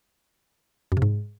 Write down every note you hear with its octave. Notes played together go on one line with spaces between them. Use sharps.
F#2
C3
G#2